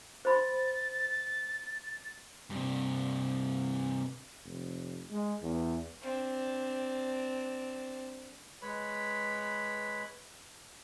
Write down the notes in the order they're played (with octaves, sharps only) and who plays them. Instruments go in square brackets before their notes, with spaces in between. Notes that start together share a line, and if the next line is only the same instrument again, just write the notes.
[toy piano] C5 B5 C6 [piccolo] A6
[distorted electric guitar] G2 C3
[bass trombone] F1
G#3
E2
[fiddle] C4 D4
[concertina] G#3 B4 C#5 B5